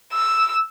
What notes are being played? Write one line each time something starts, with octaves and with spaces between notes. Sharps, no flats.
E6